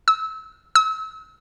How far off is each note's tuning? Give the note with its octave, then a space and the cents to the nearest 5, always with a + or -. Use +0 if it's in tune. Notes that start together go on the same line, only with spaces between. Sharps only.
E6 -25
E6 -35